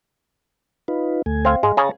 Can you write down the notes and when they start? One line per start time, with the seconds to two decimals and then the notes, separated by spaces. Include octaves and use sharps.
0.88 D#4 F4 B4
1.26 D2 A3 G#5
1.45 C4 F5
1.63 G#2 G#3 G#4 F5
1.77 C#3 G#4 C#5 A5 A#5